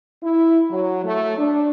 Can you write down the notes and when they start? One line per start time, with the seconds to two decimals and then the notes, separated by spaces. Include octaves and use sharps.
0.23 E4
0.71 F#3
1.04 A3
1.38 D4